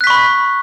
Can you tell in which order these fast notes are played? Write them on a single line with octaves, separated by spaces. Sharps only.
F#6 B6 C#6 B5